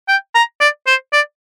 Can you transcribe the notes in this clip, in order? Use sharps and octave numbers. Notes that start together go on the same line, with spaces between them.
G5
A#5
D5
C5
D5